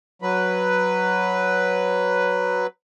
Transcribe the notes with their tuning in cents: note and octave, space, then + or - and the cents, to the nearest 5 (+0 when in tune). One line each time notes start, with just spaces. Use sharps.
F#3 +0 B4 +0